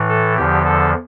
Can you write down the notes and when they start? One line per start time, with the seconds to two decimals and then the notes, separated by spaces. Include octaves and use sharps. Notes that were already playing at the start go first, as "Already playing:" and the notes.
Already playing: A2 E3
0.09 A4
0.37 E2 D3 F3 G4
0.65 A4